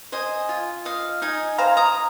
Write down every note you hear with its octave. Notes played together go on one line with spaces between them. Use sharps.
C5 D#5 G#5
F4
D#5 F5
D#4 D#5 G#5
C5 F5 A#5
A#5 D#6